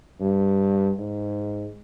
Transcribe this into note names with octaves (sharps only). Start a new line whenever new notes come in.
G2
G#2